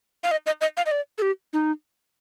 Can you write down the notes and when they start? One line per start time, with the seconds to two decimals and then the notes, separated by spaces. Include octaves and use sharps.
0.23 F5
0.31 D#5
0.46 D#5
0.61 D#5
0.77 F5
0.86 D#5
0.91 D5
1.18 A4
1.22 G4
1.53 D#4